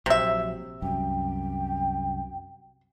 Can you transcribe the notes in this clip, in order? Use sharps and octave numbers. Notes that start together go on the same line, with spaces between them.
A#1 C3 F#3 E5
C2 F#2 G5